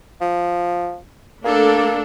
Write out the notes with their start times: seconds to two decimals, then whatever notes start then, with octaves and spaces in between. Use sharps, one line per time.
0.21 F3
1.44 A3 A#3 D4 A4